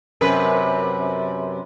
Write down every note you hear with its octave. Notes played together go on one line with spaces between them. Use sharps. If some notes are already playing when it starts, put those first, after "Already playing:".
F#2 C3 A#4 B4